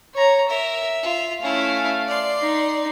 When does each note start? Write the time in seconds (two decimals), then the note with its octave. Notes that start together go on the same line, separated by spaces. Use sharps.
0.14 C#5 A#5
0.49 A#4 E5
1.03 F4
1.42 A3 C#4 E4 F5
2.08 D5 C6
2.41 D#4